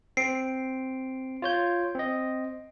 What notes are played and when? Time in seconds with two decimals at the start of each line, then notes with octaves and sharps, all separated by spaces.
0.17 C4 C7 D7
1.42 F4 C#5 G6
1.95 C4 D#5